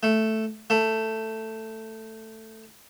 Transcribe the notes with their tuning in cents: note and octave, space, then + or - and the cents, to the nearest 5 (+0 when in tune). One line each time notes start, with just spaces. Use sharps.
A3 +0
A3 +10